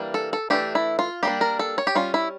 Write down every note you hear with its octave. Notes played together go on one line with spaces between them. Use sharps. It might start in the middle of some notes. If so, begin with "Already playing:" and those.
Already playing: E3 G3 A#3 D4
A4
A4
E3 A3 D4 G4
E4
F4
G3 A#3 D4 G4
A#4
A4
C#5
G4
G3 C#4 F4
E4